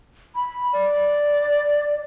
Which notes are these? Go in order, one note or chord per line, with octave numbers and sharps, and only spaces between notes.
B5
D5